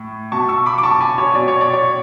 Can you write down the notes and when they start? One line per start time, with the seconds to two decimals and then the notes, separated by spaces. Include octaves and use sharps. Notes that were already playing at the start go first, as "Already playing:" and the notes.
Already playing: A2
0.32 B2 A5 C#6
0.49 C#6 E6
0.66 B5 D6
0.78 D6
0.83 A5 C#6
1.00 G#5 B5
1.18 C#5
1.35 B2 D5
1.48 C#5
1.61 D5
1.74 C#5